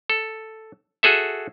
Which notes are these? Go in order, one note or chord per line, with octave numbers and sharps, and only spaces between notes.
A4
F#4 G#4 A4 E5